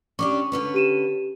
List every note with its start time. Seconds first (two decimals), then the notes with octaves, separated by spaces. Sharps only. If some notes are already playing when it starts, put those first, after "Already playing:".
0.19 C#4 D4 G4 C#6 D6
0.52 D3 C#4 B4
0.74 G4 D#7 E7